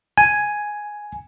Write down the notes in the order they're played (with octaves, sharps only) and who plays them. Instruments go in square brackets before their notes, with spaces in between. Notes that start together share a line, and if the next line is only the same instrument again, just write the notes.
[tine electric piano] G#5